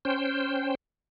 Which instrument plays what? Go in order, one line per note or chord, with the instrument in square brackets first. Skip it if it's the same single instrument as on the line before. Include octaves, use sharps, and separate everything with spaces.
[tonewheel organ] C#4 C5 G5